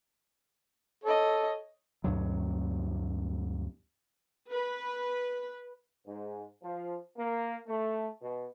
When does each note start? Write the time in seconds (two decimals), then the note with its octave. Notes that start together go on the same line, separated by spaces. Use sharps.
1.04 A4 C#5 D#5
2.04 D2 G2 B2 F#3
4.50 B4
6.06 G#2
6.62 F3
7.17 A#3
7.66 A3
8.21 B2